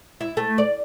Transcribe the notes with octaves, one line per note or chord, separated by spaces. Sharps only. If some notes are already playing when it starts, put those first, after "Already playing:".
E4
A3
D5